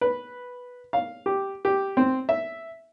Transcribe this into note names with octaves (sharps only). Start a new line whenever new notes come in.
B4
F5
G4
G4
C4
E5